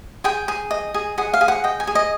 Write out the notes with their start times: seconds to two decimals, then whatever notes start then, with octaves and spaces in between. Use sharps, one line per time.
0.24 G#4 G5
0.48 G#4
0.71 D#5
0.94 G#4
1.18 G#4 F#5
1.34 F5
1.41 G#4
1.48 F#5
1.64 D#5 G5
1.80 G#5
1.87 G#4
1.95 D#5